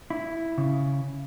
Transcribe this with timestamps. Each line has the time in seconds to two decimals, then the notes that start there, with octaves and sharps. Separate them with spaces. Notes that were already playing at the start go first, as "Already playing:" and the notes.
0.10 E4
0.58 C#3